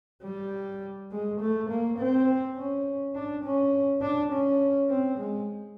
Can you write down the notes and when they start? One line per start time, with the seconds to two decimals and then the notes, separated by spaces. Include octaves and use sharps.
0.23 G3
1.11 G#3
1.40 A3
1.69 A#3
1.99 C4
2.57 C#4
3.15 D4
3.45 C#4
4.02 D4
4.32 C#4
4.90 C4
5.18 G#3